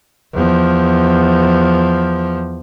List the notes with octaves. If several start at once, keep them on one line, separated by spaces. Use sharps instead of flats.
E2 F3